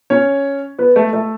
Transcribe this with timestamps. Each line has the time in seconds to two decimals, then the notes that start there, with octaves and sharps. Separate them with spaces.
0.10 C#4 C#5
0.79 B3 B4
0.96 A3 A4
1.13 A3 A4